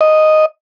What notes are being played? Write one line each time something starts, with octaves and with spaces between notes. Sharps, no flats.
D#5